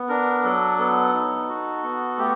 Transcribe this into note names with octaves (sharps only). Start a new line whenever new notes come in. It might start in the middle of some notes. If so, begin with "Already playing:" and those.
Already playing: B3
D4 A#4
F#3 A4
B3 A4
D#4
F#4
B3
A3 G4